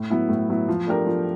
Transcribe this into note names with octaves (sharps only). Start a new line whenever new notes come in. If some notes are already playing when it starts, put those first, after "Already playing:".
Already playing: A2
F#3 B3 E4
A2
F#3 B3 E4
F3
A3 D4 G4 A#4
F3